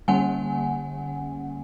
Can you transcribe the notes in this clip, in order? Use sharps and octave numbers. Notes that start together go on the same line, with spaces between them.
D3 G3 A#3 C#4 F#5 G#5